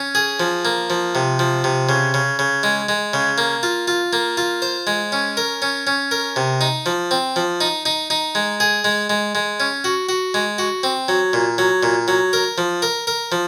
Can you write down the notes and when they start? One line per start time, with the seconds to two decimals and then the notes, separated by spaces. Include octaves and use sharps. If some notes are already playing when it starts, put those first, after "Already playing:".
Already playing: C#4
0.15 G#4
0.40 F3
0.65 A#3
0.90 F3
1.15 C3
1.39 F3
1.64 C3
1.89 C#3
2.14 C#3
2.39 C#3
2.63 G#3
2.89 G#3
3.13 C#3
3.38 A#3
3.63 F4
3.88 F4
4.13 A#3
4.37 F4
4.62 C5
4.87 G#3
5.12 C#4
5.37 A#4
5.62 C#4
5.87 C#4
6.11 A#4
6.36 C3
6.61 D#4
6.86 F3
7.11 C4
7.36 F3
7.61 D#4
7.86 D#4
8.10 D#4
8.35 G#3
8.60 G#4
8.85 G#3
9.10 G#3
9.35 G#3
9.60 C#4
9.84 F#4
10.09 F#4
10.34 G#3
10.58 F#4
10.83 C4
11.08 F#3
11.33 A#2
11.58 F#3
11.83 A#2
12.08 F#3
12.33 A#4
12.58 F3
12.82 A#4
13.07 A#4
13.32 F3